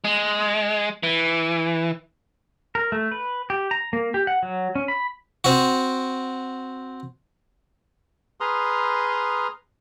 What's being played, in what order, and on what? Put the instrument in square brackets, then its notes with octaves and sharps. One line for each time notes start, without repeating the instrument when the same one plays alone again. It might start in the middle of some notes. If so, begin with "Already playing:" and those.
[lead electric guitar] G#3
E3
[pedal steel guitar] A#4
A3
B4
G4
A#5
A#3
G4
F#5
F#3
C#4
B5
[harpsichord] C4 F#4
[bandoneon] G#4 B4 A#5 C6 D#6 F6